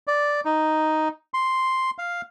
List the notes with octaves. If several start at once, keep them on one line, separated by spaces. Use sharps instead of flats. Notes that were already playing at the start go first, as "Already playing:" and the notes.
D5
D#4
C6
F5